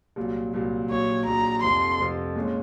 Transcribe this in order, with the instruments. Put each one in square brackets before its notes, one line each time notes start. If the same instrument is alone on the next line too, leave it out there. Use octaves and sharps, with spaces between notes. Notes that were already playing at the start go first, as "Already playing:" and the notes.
[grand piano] C2 A#2 F#3
C2 A#2 F#3
[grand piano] A#1 A#2 F#3 [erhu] C#5
[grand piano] A#1 A#2 F#3 [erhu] A#5
[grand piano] F1 F2 C3 F3 [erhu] C6
[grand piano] F1 F2 C3 F3
A#2 G#3 C#4